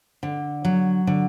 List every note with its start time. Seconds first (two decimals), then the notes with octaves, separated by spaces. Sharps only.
0.23 D3
0.65 F#3
1.07 D3